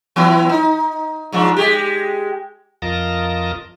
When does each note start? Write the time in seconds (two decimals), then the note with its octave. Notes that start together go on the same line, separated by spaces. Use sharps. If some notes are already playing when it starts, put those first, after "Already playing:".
0.16 E3 B3 E4
0.49 D#4
1.32 G#2 F3 D4
1.56 G#3 G4
2.82 F2 F4 A#4 D#5 A5 A#6